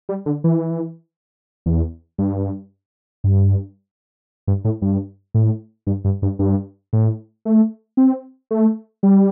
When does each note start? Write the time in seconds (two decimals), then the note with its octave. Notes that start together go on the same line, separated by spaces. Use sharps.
0.09 G3
0.26 D3
0.44 E3
1.66 E2
2.18 G2
3.24 G2
4.48 G2
4.65 A2
4.82 G2
5.34 A2
5.87 G2
6.05 G2
6.22 G2
6.39 G2
6.93 A2
7.45 A3
7.97 C4
8.51 A3
9.03 G3